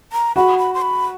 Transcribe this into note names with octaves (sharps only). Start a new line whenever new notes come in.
A#5
F#4 B5
B5
C6
B5